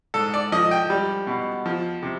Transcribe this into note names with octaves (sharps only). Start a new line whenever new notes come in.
G#2 A4
D5
F3 D#5
G5
G3
B2
F3
C3